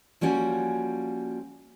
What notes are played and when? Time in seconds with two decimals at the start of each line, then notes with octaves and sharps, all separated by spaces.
0.21 F3 G3 A#3 C#4 F#4